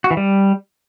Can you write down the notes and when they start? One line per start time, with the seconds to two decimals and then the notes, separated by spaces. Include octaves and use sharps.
0.04 F#4
0.11 E3
0.17 G3